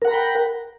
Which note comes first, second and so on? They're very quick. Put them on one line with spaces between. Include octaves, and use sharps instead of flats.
A#4 F#5 A#5 B5 G5